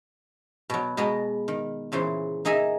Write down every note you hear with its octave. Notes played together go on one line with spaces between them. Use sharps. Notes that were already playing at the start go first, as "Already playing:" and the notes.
B2 F#3
B2 G#3 B3 D#5 A#5
D#3
A#2 C#3 E3 C5
A#3 D#4 G#4 D#5 E5